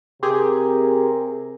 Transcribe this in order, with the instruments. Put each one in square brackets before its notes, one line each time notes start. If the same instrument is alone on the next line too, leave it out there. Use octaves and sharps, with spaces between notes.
[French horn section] C3 A#4 [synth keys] C4 G4 G#4